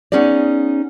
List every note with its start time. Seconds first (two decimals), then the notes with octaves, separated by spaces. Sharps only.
0.12 B3 C#4 D#4 G#4 D5